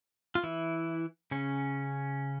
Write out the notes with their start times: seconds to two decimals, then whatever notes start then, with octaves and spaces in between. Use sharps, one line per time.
0.35 F4
0.43 E3 E4
1.31 C#3 C#4